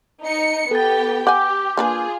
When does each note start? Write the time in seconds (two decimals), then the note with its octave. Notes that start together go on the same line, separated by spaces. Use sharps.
0.25 D#4 C#7
0.71 B3 G4 A4 G5 A6
1.27 G4 F#5 G#5 D6 G6
1.77 A#3 D4 F4 G#4 B4